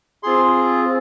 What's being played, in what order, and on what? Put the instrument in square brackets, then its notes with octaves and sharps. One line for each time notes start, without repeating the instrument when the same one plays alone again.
[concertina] C4 F4 G#4 C6